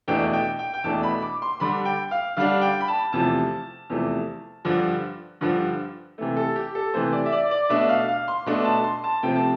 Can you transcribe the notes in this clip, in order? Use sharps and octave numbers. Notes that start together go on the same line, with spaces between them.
E2 B2 A3 D4 G5
G5
G5
G5
E2 B2 A3 D4 A5
B5
D6
C6
D3 G3 D4 B5
G5
F5
D3 G3 D4 F5
G5
B5
A5
E2 C3 F3 A3 A5
E2 C3 F3 A3
G2 D3 F3
G2 D3 F3
C3 E3 A3
A4
G4
A4
C3 E3 A3 C5
D5
E5
D5
D5
B2 A3 D4 E5
F5
F5
C6
B2 A3 D4 C6
A5
C6
A5
C3 F3 A3 C4 G5
A5